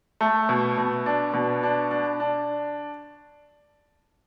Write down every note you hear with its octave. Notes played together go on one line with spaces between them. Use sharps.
A3
B2
B2
D4
B2
D4
D4
D4